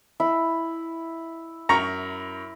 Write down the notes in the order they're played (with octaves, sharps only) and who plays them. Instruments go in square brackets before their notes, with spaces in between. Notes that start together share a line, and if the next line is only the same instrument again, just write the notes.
[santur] E4
[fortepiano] F#2 A#5 C#6